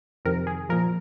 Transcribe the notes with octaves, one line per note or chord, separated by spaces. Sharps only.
F2 C3 D#3 A#4
G#4
A#2 F3 A#4